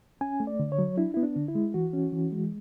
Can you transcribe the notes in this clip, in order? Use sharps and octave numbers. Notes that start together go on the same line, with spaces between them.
C#4 G#5
A3
D5
D3
C#5
F#3
D4 E4
B3 E4
D4
D3
E4
G#3
E3 F#4
C#4
E3
G#3